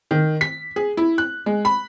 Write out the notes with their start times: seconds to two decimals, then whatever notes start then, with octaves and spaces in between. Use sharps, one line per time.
0.11 D#3
0.41 B6
0.76 G#4
0.97 E4
1.18 F#6
1.46 G#3
1.65 B5